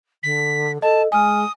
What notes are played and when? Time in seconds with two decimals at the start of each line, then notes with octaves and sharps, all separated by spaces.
0.23 D3 B6
0.82 A4 D#5 A5
1.12 G#3 G#5 D#6 F6